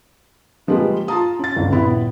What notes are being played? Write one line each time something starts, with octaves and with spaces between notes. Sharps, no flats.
D3 F3 G3 G#3 A#3 B4
F4 A5 A#5 D#6
C#4 A6
G1 C#2
D#1 B3 E4 B5